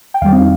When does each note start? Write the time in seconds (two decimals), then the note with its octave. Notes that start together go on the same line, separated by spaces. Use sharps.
0.14 G5
0.22 F2 D#3 G3 F5
0.32 C4
0.41 D#4